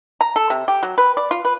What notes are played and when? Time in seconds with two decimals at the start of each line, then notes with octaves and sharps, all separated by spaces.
0.21 A#5
0.36 A4
0.50 C3
0.68 G4
0.83 F#3
0.98 B4
1.17 D5
1.31 F4
1.45 B4